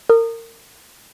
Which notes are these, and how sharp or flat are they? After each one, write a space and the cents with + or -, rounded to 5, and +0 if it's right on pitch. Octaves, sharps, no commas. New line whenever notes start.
A#4 -30 D#6 -25